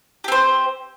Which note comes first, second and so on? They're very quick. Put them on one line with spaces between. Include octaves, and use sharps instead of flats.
G4 C4 C5